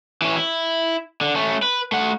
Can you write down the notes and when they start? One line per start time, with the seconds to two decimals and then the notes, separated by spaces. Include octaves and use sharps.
0.22 E3 C#4
0.36 E4
1.21 D3
1.35 A3 C#4
1.62 B4
1.92 A3 F#5